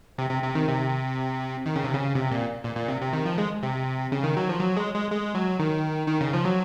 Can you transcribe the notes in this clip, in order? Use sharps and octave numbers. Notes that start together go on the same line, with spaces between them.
C3
C3
C3
D#3
C3
D#3
C#3
C3
C#3
C3
A#2
A#2
A#2
C3
C3
D#3
F3
G#3
C3
C#3
D#3
F#3
F3
F#3
G#3
G#3
G#3
F#3
D#3
D#3
C#3
F3
F#3